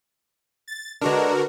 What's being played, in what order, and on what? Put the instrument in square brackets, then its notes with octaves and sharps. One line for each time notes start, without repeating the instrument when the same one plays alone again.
[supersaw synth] A6
[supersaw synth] D3 F#4 A#4 [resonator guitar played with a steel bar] G#3 D4 [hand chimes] B4 A#5